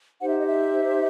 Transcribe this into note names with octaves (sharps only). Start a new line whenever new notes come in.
D#4 G4 C5 F#5
E5
D#5
E5